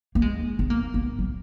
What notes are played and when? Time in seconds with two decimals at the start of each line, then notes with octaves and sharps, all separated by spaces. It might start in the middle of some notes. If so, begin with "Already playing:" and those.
0.15 A#3
0.22 G#3
0.59 B3
0.70 A#3
0.94 B3
1.19 F#3